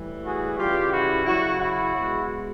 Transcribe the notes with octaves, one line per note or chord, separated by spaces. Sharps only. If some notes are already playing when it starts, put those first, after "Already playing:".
Already playing: A2 E3 G3
F#4 G#4
C#3 E3 G3 F4 G4
E4 F#4
C#3 F#3 E4 F#4
E4 F#4
B2 G#3